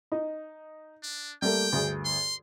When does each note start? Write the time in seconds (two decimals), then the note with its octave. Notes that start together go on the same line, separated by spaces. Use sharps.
0.12 D#4
1.03 D4
1.42 G3 A3 A#3 G5
1.73 D2 G2 G#4
2.05 C6